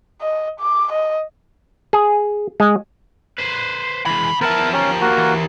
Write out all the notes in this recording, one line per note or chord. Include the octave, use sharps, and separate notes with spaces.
D#5
D6
D#5
G#4
G#3
B4 C5
C#3 E3 G#3 B5
F3 B3 A#4 E5 A5
C#4 G4 A#4
A#3 F#4
E3